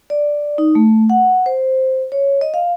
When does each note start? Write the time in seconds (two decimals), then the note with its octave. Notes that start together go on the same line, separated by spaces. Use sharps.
0.10 D5
0.58 D#4
0.75 A3
1.10 F#5
1.46 C5
2.12 C#5
2.41 D#5
2.54 F5